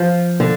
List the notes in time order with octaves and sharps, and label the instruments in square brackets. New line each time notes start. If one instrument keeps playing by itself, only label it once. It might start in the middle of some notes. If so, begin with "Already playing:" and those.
Already playing: [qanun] F3
[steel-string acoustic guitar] D3